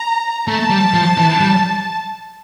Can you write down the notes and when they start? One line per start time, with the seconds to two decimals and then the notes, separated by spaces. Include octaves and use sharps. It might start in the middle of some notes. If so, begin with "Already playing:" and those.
Already playing: A#5
0.48 A3 A5
0.70 G3
0.94 F3
1.17 E3
1.40 G3